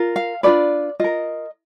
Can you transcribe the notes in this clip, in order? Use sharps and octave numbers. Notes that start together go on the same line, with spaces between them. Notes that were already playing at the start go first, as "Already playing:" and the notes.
Already playing: F4 A#4
F5
D4 F4 G#4 B4 D5
F4 A#4 D#5